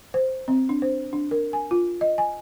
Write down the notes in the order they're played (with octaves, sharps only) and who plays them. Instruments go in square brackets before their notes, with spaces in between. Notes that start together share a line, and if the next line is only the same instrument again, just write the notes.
[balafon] C5
C4
D4
C5
D4
A#4
G#5
F4
D#5
G#5